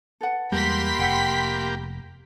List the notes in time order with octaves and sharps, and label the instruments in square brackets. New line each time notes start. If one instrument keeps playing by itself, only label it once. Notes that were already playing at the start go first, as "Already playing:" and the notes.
[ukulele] A4 B4 F#5
[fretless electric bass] E2 G3 G#3 [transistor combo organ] A#3 G4 [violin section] B5 C6 B6
[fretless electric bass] F1 [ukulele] E5 F#5 G5